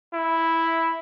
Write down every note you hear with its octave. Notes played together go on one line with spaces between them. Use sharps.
E4